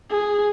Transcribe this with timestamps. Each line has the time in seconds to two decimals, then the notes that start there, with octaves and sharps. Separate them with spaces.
0.10 G#4